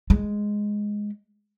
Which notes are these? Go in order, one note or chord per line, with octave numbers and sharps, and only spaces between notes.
G#3